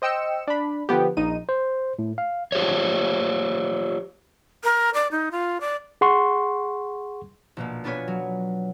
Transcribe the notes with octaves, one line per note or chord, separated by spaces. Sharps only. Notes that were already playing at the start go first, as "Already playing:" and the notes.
C5 D#5 G5 E6 C#7 E7
D4 B5
D3 F3 B3 G4
A#1 D#4 D#7
C5
A2
F5
F4 G4 C5 C#5
A#4
D5
D#4
F4
D5
G#4 F#5 C6 C#6
A#1 B2 A#3
B3 D4 F4 B4 C#5 G#5
F#3